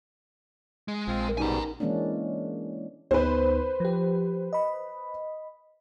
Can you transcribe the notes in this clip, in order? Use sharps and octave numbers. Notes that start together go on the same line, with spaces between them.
G#3
A#1 C4 F4
A#4 A#5
G#2 B2 G3 C#4 D#4 G#5 A#5
E3 G#3 A#3 C#4 D4
D2 B3 D#4 B4 C5
F3 G4
D#5 B5